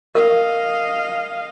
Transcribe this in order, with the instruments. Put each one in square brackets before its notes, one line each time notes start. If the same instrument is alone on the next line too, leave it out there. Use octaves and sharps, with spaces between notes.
[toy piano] A#4 [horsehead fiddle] D#5 F5